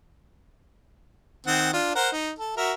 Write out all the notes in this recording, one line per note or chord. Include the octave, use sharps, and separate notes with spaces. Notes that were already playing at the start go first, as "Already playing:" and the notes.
D#3 C4 F#5
D4 F4
A#4 C5 F#5
D#4
A4
F#4 A#4 E5